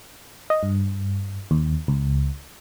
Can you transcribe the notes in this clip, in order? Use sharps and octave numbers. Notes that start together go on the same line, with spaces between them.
D#5
G2
D#2
C#2